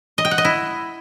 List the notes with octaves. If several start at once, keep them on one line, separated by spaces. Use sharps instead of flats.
D#5
G5
F#5
D#5
E4